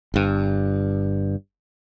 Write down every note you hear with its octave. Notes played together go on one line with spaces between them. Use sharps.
G1 G2